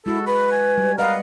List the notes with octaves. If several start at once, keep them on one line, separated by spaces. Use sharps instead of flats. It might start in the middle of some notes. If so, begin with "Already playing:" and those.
G#3 E4 F#4 A4
B4 B5
G#5
G3
A#4 B4 D#5 F5 F#5